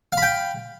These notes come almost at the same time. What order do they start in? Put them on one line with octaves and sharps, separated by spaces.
F5 B5 G5